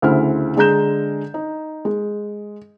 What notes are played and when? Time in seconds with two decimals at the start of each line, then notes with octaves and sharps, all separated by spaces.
0.02 D2 C#3 E4 C5 F6
0.57 D3 G#3 G#4 A#5 G6 E7
1.34 D#4
1.85 G#3